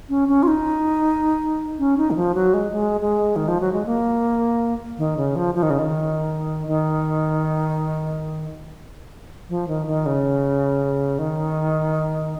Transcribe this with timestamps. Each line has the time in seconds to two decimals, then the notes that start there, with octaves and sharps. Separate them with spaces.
0.09 C#4
0.28 C#4
0.43 F4
0.47 D#4
1.79 C#4
1.97 D#4
2.11 D#3
2.16 F3
2.35 F#3
2.54 G#3
2.72 G#3
3.01 G#3
3.36 D#3
3.48 F3
3.61 F#3
3.73 G#3
3.86 A#3
4.98 D#3
5.17 C#3
5.36 F3
5.55 F3
5.63 D#3
5.70 C#3
5.79 D#3
6.68 D#3
9.49 F3
9.68 D#3
9.87 D#3
10.06 C#3
11.19 D#3